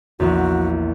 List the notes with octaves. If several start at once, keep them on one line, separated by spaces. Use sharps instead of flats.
A#1 E2 F#4